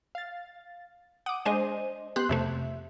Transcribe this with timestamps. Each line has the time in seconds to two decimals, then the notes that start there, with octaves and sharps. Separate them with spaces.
0.15 F5 A6
1.26 F#5 D6 D#6
1.45 G#3 D4 C5 D#5 G#5 D#7
2.16 B3 G4 C6 F#6
2.29 F2 C3 A3 E5